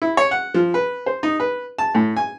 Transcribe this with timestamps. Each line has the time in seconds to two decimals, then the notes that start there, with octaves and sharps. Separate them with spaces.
0.02 E4
0.17 C#5
0.31 F#5
0.54 F3
0.74 B4
1.06 C5
1.23 D#4
1.40 B4
1.78 A5
1.95 A2
2.17 G#5